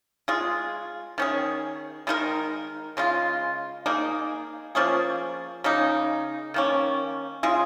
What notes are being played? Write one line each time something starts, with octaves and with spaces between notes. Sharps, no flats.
G#3 F4 G#4
D#3 C#4 G#4
D#3 G#3 D#4 A#4
C#3 G#3 F4
A#3 D#4 G#4
F3 A#3 C#4 G#4
C#3 A#3 D#4
D#3 A#3 C#4
C#3 G#3 F4 G#4